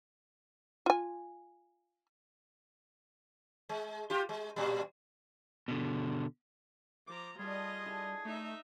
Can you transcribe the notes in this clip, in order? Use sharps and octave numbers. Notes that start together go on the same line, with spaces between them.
F4 G#5
G#3
F4 G4
G#3
A#2 G3
B2 D3
F3 A#5 D6
G3 A3 F4 G#4 A4 D5 D#5
D4 E4 A4
A3 D#4 E5